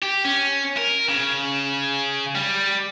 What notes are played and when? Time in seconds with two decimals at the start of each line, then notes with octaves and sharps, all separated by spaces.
0.02 G4
0.25 C#4
0.77 A#4
1.08 C#3
2.35 G3